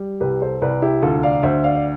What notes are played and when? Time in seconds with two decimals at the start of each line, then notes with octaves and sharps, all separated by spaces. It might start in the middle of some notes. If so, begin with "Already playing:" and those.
Already playing: G3
0.20 C2 G4 B4
0.42 A4 C5
0.62 C2 B4 D5
0.82 E4 G4
1.02 D2 F4 A4
1.23 D5 F5
1.43 D2 C5 E5
1.64 D5 F5
1.75 D5